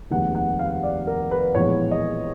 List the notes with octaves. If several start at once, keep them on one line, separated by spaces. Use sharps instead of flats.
F1 D#2 D#3 G#3 F#5
F#5
F5
D5
A#4
B4
A#1 A2 E3 G#3 B3 C#5
D#5